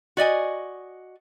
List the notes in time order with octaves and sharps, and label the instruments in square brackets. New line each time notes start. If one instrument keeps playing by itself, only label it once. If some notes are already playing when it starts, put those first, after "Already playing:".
[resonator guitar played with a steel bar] F#4 D5 D#5 G#5